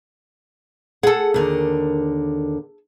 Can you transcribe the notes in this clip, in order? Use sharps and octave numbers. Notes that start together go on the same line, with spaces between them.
G#4 A4 F#5
D#2 D3 A#4